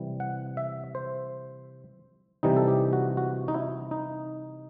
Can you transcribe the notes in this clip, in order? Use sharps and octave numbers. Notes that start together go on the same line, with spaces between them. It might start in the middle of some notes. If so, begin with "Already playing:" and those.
Already playing: C3 E3 G3
F#5
E5
C5
C3 E3 G3 D#4
A4
G4
F#4
F#4
D#4
E4
D#4